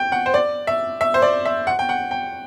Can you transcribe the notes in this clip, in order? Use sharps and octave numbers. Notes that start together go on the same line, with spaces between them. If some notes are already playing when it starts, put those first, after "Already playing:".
Already playing: G5
F#5
C5
D5
E5
E5
C5
D5
E5
F#5
G5
F#5
G5